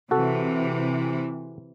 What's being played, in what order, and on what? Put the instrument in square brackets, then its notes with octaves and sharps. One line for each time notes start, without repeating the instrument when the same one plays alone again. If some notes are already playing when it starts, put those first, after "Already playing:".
[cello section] C3 E3 [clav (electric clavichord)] F#4 A4